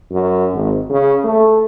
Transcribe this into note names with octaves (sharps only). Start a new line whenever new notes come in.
F#2
G#1
C#3
A3